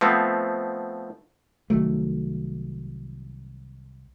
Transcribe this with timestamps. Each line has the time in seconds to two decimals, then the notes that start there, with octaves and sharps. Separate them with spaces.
0.01 F3 A3 B3 C4
1.70 C2 D#3 F#3 A3